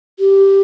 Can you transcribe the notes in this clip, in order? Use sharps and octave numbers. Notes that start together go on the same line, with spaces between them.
G4